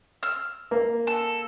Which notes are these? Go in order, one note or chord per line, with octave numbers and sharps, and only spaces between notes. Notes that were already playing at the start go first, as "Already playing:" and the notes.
E6 F6
A#3
A4